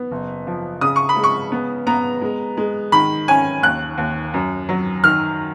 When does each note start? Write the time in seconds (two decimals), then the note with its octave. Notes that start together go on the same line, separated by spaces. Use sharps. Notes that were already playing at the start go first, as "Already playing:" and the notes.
Already playing: B3
0.12 F#1
0.47 F3
0.81 C#3 D#6
0.96 C#6
1.09 B5
1.17 G#3
1.24 C#6
1.52 B3
1.87 B3 A#5
2.22 G#3
2.57 G#3
2.92 D#3 B5
3.28 C#4 G#5
3.63 D#2 F#6
3.98 D#2
4.34 F#2
4.69 F#3
5.04 D#3 F6